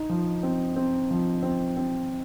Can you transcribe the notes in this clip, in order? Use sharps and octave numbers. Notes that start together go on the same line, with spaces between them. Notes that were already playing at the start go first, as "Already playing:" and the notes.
Already playing: D#4
F3
C4
C4
F3
C4
C4